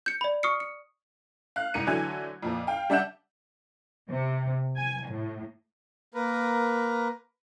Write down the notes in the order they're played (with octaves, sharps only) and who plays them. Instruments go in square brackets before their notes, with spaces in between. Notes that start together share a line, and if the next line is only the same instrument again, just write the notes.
[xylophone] G6 C#7
D5 B5
C#6 D#6 F6 C7 C#7
C#7
[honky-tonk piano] F5 F#6
C2 G#2 A#4 C#7 D#7
D3 E3 F#3 A3 G#5 G#6
F2 A#2 F3
F5 G5
G3 D4 E5 F#5 G6 E7
[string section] C3
G#5
A2
[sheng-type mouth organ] A#3 A#4 B4